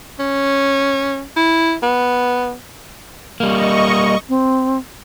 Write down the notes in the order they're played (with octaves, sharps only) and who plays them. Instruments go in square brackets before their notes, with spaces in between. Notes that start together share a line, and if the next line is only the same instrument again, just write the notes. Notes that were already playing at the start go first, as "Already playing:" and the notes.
[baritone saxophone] C#4
E4
B3
[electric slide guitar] G3 A#3 [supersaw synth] D#5 C#6
[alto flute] C4